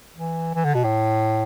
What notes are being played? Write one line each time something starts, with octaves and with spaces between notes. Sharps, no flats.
E3
E3
D3
B2
A2